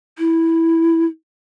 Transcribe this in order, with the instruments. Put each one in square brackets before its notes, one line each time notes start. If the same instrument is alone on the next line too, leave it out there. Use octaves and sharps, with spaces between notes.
[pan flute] E4